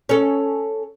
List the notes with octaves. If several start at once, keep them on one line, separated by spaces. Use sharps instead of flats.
C#4 A4